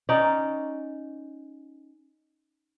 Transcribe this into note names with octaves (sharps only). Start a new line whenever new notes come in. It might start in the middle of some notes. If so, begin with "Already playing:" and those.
C#4 D#4 D5